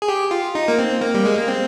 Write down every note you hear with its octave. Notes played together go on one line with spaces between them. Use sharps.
G#4
G4
F4
D#4
A#3
C4
A#3
G3
G#3
A#3
C4